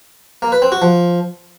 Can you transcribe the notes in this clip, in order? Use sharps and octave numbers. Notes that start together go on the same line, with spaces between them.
A#3
B4
C4
F#4
F3